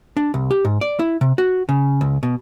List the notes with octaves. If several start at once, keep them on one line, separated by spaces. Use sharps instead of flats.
D4
C2
G4
G#2
D5
E4
C3
F#4
C#3
C#2
B2